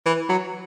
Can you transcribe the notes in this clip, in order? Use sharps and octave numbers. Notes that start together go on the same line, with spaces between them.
E3
F#3